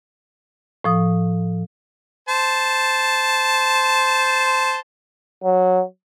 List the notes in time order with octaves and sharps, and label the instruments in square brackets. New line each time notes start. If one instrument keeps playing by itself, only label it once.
[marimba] A2 F3 D#6
[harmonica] C5 A5
[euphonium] F#3